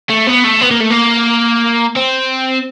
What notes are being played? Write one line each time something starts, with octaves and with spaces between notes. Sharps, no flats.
A3
B3
A3
B3
A#3
A3
A#3
C4